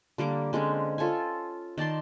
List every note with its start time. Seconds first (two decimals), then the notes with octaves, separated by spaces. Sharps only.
0.18 D3 G3 A#3 D6
0.53 D3 G#3 C4 C#4
0.98 F4 A4 C#5 G#5
1.78 D#3 D5 A5 C6